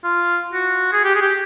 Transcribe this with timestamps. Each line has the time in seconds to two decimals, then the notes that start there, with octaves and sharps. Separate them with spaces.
0.04 F4
0.53 F#4
0.93 G#4
1.04 G4
1.15 G#4
1.22 G4